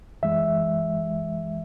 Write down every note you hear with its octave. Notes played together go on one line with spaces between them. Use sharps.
F#2 E3 G#3 E5